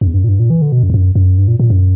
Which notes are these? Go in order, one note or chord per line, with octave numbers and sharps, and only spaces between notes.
F#2
E2
G2
F#2
A#2
G2
A#2
E3
D3
B2
F#2
E2
F#2
F#2
G2
A#2
A#2
F#2